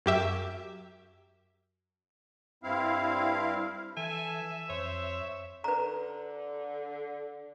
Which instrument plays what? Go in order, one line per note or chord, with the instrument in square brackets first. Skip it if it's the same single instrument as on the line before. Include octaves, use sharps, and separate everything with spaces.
[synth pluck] F#2 G4 E5
[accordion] G2 C4 E4 F5
[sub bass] E3 [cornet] A4 [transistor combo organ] E5 [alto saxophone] G#5
[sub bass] F2 [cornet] C5 [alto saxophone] C#5
[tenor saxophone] D3 [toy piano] B4 A#5